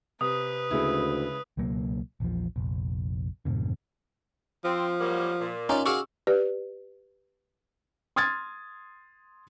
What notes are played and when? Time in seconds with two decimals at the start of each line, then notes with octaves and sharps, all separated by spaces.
0.21 C3 B4 D#6
0.71 D2 C#3 G#3 E4
1.57 C#2 B2 F#3 A#3
2.20 A#1 E2 C#3 F3
2.56 F1 A#1
3.45 F2 G#2 B2 D3
4.64 F3 C4
5.00 F#3 G3 A#3
5.40 A#2
5.69 C#4 D#4 F4 D5
5.86 F#4 G#4 F5 C#6 D6 E6
6.27 G4 B4 D5
8.16 C6 D#6 F6 G#6 A6